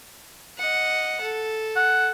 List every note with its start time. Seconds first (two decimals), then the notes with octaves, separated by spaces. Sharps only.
0.58 D#5 F#5
1.21 A4
1.76 F#5